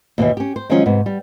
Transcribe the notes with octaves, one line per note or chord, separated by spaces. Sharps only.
D#2 B2 E3
C#4 G4
C5
D#3 F3 F#3 G#3 C#4 D#5
G#2 C3 B3
G3